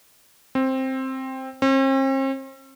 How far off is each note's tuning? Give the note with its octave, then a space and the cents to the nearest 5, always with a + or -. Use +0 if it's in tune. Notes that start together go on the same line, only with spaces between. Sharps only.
C4 +10
C4 +45